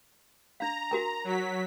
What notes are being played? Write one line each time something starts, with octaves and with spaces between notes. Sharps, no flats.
D4 F5 A#5
F#4 A#4 G#5
F#3 B6